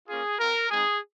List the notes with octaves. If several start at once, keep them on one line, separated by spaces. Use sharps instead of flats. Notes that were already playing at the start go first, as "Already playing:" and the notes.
A#3 C#4 F4 G#4
C4 F4 A#4
G#3 C4 D#4 G#4